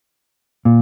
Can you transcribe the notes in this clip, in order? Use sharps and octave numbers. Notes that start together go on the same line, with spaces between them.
A#2